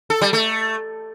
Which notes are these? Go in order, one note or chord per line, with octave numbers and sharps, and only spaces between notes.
A4
G3
A3